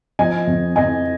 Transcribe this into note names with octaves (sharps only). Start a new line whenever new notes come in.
F3 D#5 G#5
F2
F2 D#5 G#5